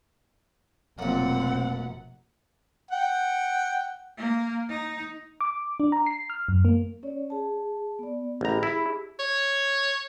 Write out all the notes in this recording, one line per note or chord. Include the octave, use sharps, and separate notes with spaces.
F1 A#1 F#2 B2 C4 F#5
F#5 G5
A#3
D#4
D6
D4
A#5
C7
F6
F#2
A#3
C#4 C#5 D5
G#4 A5
B3 D5
A1 G4 G#4 A#5 B5
E4
C#5